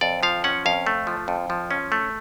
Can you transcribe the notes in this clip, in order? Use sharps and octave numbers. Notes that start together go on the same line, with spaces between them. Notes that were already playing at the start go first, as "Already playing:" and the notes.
F2 D5
F3 F5
C#4 F#5
F2 F5
A3
F3
F2
F3
C#4
A3